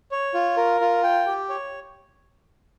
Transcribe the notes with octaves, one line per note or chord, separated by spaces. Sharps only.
C#5
F4
A#4
F4
G5
G4
C#5